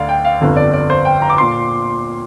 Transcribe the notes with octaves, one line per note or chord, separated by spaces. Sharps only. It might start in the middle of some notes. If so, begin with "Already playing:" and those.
Already playing: D2 D3 D5 F5
G5
F5
G1 F2 D3
D5
D5
C5
G5
A#5
D6
A#2 C6